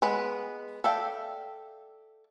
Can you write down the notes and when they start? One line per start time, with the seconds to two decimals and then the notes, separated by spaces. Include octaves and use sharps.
0.02 G#3 B3 B4
0.84 A4 D5 E5 F5 G5